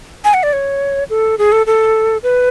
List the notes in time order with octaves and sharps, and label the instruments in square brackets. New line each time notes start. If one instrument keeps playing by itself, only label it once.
[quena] G#5
F#5
D5
C#5
A4
G#4
A4
A4
B4